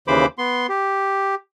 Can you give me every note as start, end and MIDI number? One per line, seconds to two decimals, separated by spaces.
0.08 0.26 39
0.08 0.26 49
0.08 0.26 52
0.08 0.26 72
0.08 0.26 83
0.08 0.26 86
0.38 0.67 59
0.38 0.67 84
0.69 1.35 67